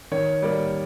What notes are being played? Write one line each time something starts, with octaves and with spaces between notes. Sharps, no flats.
D#3 C#5
G3 A#3 D5